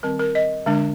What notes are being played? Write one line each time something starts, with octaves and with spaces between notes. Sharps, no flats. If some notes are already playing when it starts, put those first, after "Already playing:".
D#3 G3 C4 A#4
A#4
D#5
D3 G#3 D4